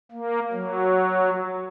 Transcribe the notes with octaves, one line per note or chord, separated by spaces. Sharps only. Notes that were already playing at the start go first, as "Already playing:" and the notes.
A#3
F#3